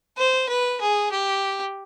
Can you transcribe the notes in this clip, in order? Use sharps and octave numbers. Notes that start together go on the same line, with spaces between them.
C5
B4
G#4
G4